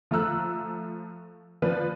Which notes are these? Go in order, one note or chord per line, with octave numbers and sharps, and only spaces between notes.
F3 A3 A#5 E6 F#6
F3 B4 D5